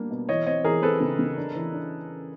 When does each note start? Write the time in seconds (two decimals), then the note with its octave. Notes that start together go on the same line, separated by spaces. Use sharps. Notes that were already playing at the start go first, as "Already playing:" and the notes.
Already playing: G3 A#3 D4
0.11 B2
0.29 E3 C#5 D#5
0.47 C4 C#5 D#5
0.64 E3 G#4 A#4
0.82 C4 A4 B4
1.01 C#3
1.19 C#3
1.37 D4
1.55 E3
1.73 D4